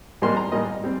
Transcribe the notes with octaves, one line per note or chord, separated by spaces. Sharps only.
G#2 G3 A#3 C6
A#5
G#2 G3 A#3 D#5
G3 C4